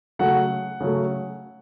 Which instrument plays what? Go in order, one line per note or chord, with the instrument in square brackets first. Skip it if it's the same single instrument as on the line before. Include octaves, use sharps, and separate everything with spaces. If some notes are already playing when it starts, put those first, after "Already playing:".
[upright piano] C#3 F#3 A3 F#5
C#3 F#3 A3